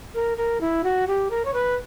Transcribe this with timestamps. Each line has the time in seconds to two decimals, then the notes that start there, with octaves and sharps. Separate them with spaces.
0.15 A#4
0.37 A#4
0.61 E4
0.84 F#4
1.07 G4
1.30 A#4
1.45 C#5
1.54 B4